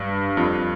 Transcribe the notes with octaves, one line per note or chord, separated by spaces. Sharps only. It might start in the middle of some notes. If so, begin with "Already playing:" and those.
Already playing: G2
F2